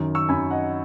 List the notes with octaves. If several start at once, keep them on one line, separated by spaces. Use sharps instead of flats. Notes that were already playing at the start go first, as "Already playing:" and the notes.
Already playing: F#2 D#3
C#6 E6
F#2 D#3 G#5 B5
D#5 F#5